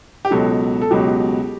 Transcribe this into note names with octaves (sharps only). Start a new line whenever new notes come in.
G4
C#2 B2 F#3 A4
A4
C#2 B2 F#3 G4